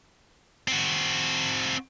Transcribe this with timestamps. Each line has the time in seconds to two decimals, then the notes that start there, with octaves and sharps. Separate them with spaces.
0.68 C4 F#4